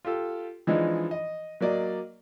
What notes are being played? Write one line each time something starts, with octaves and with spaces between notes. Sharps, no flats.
F4 G4 A4
E3 F3 G#3 D4 D#4
D#5
F#3 A#3 D5 D#5